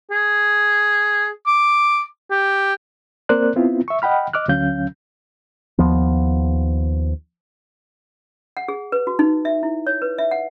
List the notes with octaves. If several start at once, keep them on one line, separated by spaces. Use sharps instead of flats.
G#4
D6
G4
A#3 C4 A#4 C5 D5 F#6
B3 C4 E4 F4
E5 C#6
D#5 F#5 G5 B5 F6
D#5 D6 F6 F#6
D2 D3 F#3 C#4 F5 G6
D#2 F3 B3
F#5
G#4
B4
F#4
D#4
E5
E4
C#5
B4
E5
F#5